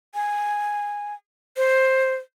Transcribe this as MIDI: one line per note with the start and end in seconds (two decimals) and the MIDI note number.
0.15 1.14 80
1.57 2.15 72